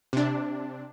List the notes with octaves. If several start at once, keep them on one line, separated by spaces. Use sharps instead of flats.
C3 D4